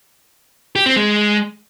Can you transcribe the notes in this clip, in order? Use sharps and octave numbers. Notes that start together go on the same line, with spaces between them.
G4
C4
G#3